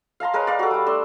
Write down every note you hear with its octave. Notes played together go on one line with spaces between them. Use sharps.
F5 A5 A#5 C6
G#3 A#4 B4 C#5
D5 F5
F#4 A4
G3 F5
A3 D4 C6 E6